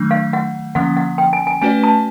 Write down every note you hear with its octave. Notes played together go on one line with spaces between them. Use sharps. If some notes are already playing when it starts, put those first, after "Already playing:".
Already playing: D#3 F#3 A3 D4
F5
F#5
D3 F3 A#3 C#4 F#5
F#5
G5
G#5
G#5
A3 C#4 F#4 B4 D5 G#5
A5